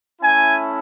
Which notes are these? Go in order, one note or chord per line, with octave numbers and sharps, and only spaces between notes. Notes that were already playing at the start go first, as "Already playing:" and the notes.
A3 C#4 E4 G#5